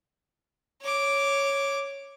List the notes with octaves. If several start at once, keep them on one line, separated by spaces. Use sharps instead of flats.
C#5 D6